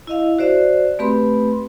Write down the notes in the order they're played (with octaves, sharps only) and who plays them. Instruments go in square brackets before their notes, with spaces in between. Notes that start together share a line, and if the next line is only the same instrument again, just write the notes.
[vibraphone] E4 D#5 F5
F#4 C5 D5 E5
A3 C4 G4 B4 B5 C6